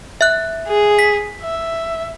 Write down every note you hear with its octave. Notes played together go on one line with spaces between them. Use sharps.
E5 F#6
G#4
B6
E5